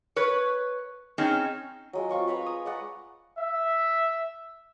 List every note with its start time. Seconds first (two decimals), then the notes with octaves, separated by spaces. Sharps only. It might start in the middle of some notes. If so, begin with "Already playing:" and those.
0.16 B4 C#5
1.18 C4 C#4 D#4 G#4
1.93 F#3 G#3 F4
2.09 C4 F4 C#6 D6
2.27 B4 C#5 A#5 B5
2.46 D#6
2.65 G#3 D5 F#5 A#5
3.38 E5